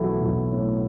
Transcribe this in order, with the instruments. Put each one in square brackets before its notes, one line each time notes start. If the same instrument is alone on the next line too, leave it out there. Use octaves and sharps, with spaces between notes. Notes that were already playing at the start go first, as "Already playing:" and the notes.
Already playing: [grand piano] B1 E3 E4 F#4 A4
B1
A2